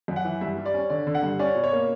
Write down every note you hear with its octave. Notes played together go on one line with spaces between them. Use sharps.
F#2
F#5
E3
G2 E5
G3
D5
C#4
D3 D5
D3
F#5
G2
C#4 D5
B2
C#5
A#3